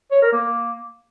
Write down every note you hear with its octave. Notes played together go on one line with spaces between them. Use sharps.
C#5
A#4
A#3